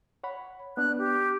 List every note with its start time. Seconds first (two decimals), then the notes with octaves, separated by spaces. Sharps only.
0.24 C#5 F#5 B5
0.77 B3 D4 F#6
0.98 G4